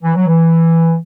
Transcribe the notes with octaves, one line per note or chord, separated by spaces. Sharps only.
E3
F#3
E3